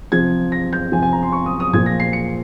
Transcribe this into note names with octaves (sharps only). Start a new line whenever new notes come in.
C3 F3 G#6
A#6
G6
C3 F3 G#5
G#5
A#5
C6
C#6
D#6
D#6
A#2 F3 G#6
A#6
C7
C#7